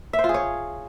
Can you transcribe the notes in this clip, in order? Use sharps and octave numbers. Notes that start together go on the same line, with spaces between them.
E5
C5
F4
G#4
C#5